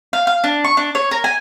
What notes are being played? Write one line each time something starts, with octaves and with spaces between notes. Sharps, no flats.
F5
F5
D4
C#6
D4
C#5
A#4
G#5